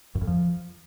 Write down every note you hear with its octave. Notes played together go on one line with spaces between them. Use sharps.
F#2
F2
F3